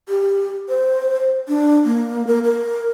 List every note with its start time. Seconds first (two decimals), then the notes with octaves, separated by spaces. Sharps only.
0.09 G4
0.69 C5
1.48 D4
1.85 A#3
2.27 A#4
2.44 A#4